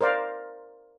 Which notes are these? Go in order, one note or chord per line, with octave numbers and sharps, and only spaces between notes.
A#4 C5 D5 F5